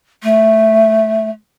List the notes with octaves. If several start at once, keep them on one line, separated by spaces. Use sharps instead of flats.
A3